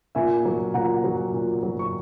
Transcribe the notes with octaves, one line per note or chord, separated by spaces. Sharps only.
A#2 E5 G#5
F#3
A#2 F#5 A#5
F#3
A#2
F#3
C#6